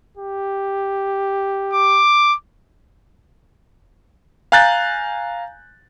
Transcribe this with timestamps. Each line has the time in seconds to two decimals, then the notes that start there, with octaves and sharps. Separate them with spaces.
0.17 G4
1.74 D6
4.52 F5 G#5 A#5 F#6 G6 A6